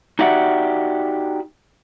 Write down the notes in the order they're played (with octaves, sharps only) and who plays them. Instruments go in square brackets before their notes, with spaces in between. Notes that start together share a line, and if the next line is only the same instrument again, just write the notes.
[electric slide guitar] D#4 F#4 G4 D5 E5 F#5